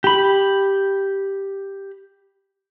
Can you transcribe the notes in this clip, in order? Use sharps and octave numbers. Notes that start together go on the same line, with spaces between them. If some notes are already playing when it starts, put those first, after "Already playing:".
G4 B5